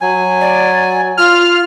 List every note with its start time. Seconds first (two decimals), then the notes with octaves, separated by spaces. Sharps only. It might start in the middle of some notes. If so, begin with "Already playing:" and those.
0.01 F#3 G#5
0.40 D5
1.17 F4 F6